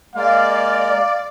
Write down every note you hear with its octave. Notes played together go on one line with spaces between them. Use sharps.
G#3 A#3 D5 F5